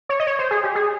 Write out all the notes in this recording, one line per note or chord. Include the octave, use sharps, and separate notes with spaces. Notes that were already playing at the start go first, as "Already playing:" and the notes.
C#5
D#5
C#5
C5
G#4
G4
G#4